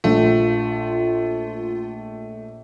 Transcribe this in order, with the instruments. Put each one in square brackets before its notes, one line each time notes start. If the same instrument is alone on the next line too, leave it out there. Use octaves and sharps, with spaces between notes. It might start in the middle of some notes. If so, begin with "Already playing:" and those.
[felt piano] A#1 [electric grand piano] A3 [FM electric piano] F4